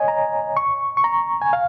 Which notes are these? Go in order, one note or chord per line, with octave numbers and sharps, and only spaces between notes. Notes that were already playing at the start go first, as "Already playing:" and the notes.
Already playing: C#5 D#5 G#5
A#5
C#6
C#6
A#5
G#5
F5